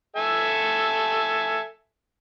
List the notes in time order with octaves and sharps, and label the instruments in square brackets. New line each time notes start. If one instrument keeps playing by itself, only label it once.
[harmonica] A4 E5 G#5